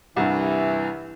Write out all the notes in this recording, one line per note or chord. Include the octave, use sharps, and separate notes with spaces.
C2 G2 E3 E4